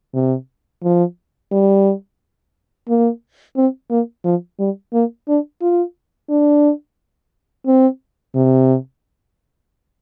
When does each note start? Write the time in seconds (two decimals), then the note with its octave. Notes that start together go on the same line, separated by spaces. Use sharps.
0.14 C3
0.83 F3
1.52 G3
2.89 A#3
3.56 C4
3.90 A#3
4.24 F3
4.59 G3
4.93 A#3
5.28 D4
5.61 F4
6.30 D4
7.67 C4
8.35 C3